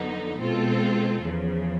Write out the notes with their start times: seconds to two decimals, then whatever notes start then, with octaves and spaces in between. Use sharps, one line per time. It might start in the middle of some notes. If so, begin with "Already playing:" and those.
Already playing: F2 D3 F#3 B3 D#4
0.38 B2 G#3 C4 F4 A4
1.23 E2 C#3 F3